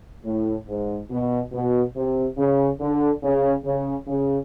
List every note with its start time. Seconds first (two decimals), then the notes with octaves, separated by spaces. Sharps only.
0.25 A2
0.68 G#2
1.10 B2
1.52 B2
1.95 C3
2.38 C#3
2.80 D3
3.23 C#3
3.65 C#3
4.07 C#3